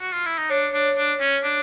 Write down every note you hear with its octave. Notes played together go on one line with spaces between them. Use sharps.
F#4
F4
E4
D#4
D4 C#5
D4
D4
C#4
D4